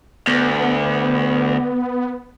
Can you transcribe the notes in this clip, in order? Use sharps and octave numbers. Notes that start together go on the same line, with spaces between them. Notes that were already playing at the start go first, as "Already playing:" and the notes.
D2 B3